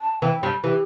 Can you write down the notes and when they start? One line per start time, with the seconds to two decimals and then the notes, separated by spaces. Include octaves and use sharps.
0.01 A5
0.22 E3 G5
0.43 G2 G3
0.64 E3 G4